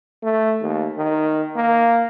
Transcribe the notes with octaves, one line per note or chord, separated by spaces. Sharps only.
A3
D#2
D#3
A#3